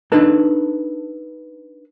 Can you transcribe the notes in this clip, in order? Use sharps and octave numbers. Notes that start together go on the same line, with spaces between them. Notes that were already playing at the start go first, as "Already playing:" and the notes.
D4 D#4 A4 B4 A5